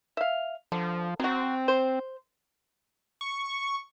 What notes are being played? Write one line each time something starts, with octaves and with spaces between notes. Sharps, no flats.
E5 F5
D3 F3
F#3 C4 F#4
C5
C#6